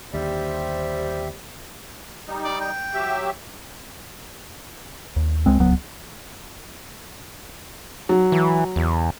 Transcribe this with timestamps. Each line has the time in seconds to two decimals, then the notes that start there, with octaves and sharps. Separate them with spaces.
0.14 D#2 D3 G3 G4 C5 E5
2.27 G3 D#4
2.45 D5
2.61 G5
2.94 F#3 G4 E5
3.46 G2
5.16 D#2
5.46 C#2 G#3 C4
5.59 D1 C#2 F#3 B3
8.09 F#3
8.32 E3
8.76 E2